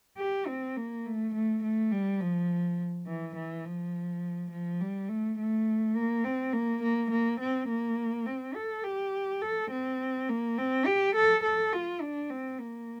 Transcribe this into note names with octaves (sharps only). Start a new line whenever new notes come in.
G4
C4
A#3
A3
A3
A3
G3
F3
E3
E3
F3
F3
G3
A3
A3
A#3
C4
A#3
A#3
A#3
C4
A#3
C4
A4
G4
A4
C4
A#3
C4
G4
A4
A4
F4
D4
C4
A#3